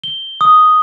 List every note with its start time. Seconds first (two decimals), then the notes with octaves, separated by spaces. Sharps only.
0.04 G7
0.41 D#6